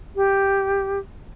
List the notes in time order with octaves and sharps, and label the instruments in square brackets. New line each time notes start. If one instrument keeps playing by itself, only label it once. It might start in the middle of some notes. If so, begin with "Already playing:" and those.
[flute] G4